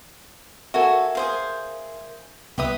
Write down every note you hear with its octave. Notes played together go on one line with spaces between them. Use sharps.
F#4 A4 A#4 E5 G#5
G#4 C5 F5
C2 B3 G4 B4 E5 D#6